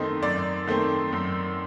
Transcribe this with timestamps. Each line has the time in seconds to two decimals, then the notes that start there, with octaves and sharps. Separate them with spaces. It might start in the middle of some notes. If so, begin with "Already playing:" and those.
Already playing: F#2 D#3 A3 C4 D#5
0.22 F#2 D5
0.67 D#3 A3 C4
1.13 F#2